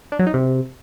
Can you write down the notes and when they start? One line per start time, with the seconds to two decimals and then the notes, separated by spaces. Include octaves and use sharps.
0.12 D4
0.19 F#3
0.27 D#4
0.34 C3